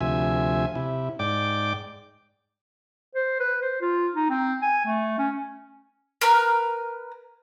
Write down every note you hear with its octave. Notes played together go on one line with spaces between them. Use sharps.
D2 C3 F3 E5 G#5
C3 E4
G#2 D5 G5 D6
C5
B4
C5
F4
D#4
C4
G#5
A3
C#4
A#4 B4 A#5 F6